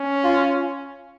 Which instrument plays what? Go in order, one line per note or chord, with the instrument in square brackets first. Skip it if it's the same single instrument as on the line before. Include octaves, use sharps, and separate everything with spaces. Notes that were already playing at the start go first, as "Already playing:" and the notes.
Already playing: [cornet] C#4
[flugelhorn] F4